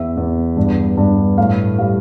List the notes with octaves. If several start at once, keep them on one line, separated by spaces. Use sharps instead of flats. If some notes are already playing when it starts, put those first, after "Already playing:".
Already playing: E2 E5
E2
G2
G2
A2 F5
G3 F5